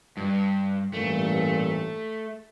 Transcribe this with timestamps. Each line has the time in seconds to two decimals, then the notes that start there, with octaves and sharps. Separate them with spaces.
0.17 G2
0.93 A1 G2 A#2 A3